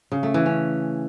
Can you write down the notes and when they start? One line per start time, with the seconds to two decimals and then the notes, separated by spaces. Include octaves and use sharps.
0.12 C#3
0.23 A3
0.34 E3
0.46 C#4